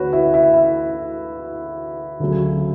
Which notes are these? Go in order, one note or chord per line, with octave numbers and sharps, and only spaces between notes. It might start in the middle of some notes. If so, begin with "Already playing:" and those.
Already playing: D2 C#3 A3 F#4 B4 C#5
E4
E4
E4
D2 C#3 F#3